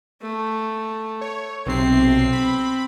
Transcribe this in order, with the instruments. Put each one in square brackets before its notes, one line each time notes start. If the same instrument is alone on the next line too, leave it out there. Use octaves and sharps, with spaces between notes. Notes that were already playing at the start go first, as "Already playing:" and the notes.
[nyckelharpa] A3
[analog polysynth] C#5
[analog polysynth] B1 C3 C7 [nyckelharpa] C4
[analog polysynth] B5